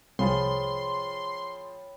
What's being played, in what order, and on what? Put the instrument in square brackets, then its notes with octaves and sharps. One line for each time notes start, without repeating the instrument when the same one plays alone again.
[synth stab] C2 [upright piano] F3 F4 G#4 [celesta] C#5 G5 B5 [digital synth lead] C6